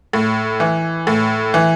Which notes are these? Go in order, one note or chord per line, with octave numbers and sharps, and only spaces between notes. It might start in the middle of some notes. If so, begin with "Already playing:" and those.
A2
E3
A2
E3